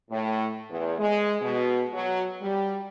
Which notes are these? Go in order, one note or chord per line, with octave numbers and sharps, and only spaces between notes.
A2
E2
G#3
B2
F#3
G3